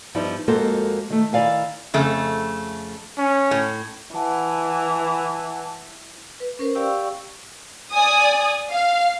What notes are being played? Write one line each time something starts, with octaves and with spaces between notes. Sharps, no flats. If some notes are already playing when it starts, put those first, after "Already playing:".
G2 F3 G3 B3 D#4 E4
F2 G#3 A#3 F#4 A4 C5
D#3 A3
D#3 E4 D5 F5 G#5
F2 C#3 A3
C#4
A2
E3 F#5 A5
B4
C#4 A#4 C5
G4 D5 F5 G5 C#6 E6
D5 G#5 D#6
F5